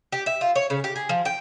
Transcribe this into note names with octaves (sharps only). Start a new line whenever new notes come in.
G4
E5
F4
C#5
C#3
G4
G#4
F3
G5